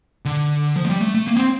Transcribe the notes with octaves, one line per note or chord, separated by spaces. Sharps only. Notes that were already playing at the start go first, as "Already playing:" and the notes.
D3
F3
A3
G3
A3
A3
A#3
C4